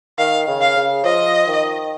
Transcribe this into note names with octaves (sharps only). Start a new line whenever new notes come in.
D#3 F5
C#3
F5
C#3
F3 D#5
D#3